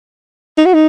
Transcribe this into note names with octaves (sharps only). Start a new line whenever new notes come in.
D#4
F#4
D#4